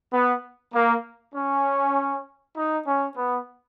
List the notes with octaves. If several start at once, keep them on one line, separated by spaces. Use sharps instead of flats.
B3
A#3
C#4
D#4
C#4
B3